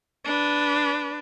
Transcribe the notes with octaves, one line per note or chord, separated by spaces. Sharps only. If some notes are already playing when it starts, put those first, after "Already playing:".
D4 B4